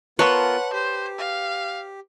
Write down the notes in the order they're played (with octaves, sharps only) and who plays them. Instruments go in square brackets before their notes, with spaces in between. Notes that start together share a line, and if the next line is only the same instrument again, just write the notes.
[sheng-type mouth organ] B3 F4 A#4 [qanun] B4 [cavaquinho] C#5 A5 C6 [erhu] F#5
[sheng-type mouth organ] G4 [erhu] C5
[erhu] F5